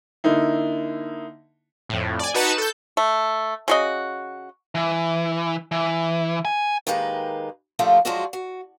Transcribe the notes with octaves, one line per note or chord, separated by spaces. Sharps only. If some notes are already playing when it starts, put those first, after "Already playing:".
D3 A#3 D#4 E4
F2 A2
D5 G#5
D#4 F#4 B4 A5 C#7 E7
A4 G6
A3
C#3 F#4 D#5
E3
E3
G#5
D#3 G#3 A#3 G4 B4
D3 F3 A3 A#3 F4 G4
F3 F#3 G#3 F4 F#4 D5
F#4